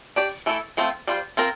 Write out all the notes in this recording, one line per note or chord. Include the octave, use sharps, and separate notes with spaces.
D4 G4 D5
E3 A3 E4 A4
F3 A3 C4 F4
G3 D4 F4 C5
C4 F4 A#4